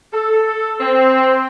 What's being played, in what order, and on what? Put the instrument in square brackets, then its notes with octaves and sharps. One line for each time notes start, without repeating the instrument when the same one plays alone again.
[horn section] A4
C4